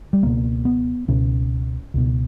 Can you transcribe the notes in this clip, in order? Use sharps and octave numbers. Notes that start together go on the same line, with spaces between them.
G3
C#2 B2 A#3
B3
C#2 B2 C#4
C#2 B2